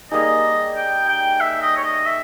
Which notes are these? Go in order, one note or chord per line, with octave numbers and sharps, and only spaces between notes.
G3 A#3 D#4 G#4 D#5
G5
G5
E5
D#5
C#5
D#5
E5